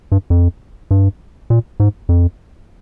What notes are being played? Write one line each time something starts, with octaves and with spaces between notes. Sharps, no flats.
G2
F2
G2
A#2
G#2
F2